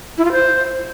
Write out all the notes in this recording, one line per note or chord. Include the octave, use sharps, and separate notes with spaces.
E4
F4
C5